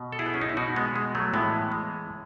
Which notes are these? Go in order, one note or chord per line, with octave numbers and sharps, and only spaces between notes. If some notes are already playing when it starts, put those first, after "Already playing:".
Already playing: B2
A4
E4 G#4
B3
C#4
D#4
E4
B2 D#4 F#4
G#3 B3
G#3
F#3 A3
A2 E3 G#3 B3
G#3